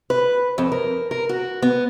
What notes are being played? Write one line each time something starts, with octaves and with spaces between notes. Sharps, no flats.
B4
F2
A#4
A#4
F#4
B3